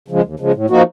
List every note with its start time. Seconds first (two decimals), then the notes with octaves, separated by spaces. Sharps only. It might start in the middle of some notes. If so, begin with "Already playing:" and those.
0.08 C#3 F3 G#3
0.23 D#2
0.40 C#3 F3 G#3
0.54 A2
0.70 F3 A#3 D#4 F#4